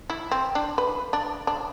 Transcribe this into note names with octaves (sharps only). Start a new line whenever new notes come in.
E4
C4
D4
B4
D4
D4